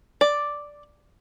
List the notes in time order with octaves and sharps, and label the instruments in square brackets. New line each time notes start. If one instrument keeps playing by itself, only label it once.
[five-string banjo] D5